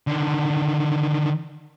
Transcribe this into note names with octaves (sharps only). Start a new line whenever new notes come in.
D3 D#3